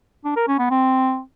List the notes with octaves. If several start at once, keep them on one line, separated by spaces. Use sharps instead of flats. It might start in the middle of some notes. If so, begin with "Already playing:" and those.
D4
A#4
C#4
B3
C4